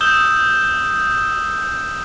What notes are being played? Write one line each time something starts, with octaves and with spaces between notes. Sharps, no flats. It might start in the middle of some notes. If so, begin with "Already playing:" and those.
D#6 E6 G6 E7 G7